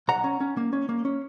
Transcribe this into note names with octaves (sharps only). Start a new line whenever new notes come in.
B1 F#5 A#5
C#4
C#4
A#3
C#4
A#3
C#4